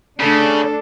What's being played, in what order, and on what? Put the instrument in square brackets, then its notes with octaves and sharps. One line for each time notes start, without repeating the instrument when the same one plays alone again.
[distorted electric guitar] C#3 [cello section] A3 D4 [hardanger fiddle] A4